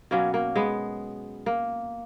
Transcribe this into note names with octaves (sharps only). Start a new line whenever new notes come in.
B2 F#3 A#3 C#4
A#3
G#3 B3
A#3